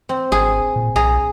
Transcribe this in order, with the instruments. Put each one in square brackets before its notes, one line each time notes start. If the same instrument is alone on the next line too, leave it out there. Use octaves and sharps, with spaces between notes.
[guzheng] C4
[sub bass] G#1 [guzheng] G#4
[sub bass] A#2
[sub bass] B1 [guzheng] G#4 A#5